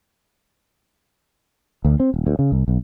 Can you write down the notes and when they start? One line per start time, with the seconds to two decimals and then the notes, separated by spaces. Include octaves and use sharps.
1.85 D2
2.00 C4
2.14 D#1
2.27 D2
2.39 C#3
2.52 C2
2.68 B1